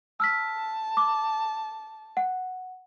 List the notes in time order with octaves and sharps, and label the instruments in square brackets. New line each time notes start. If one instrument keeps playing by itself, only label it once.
[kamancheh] A5 [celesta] E6 F6 B6
[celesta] D6
F#5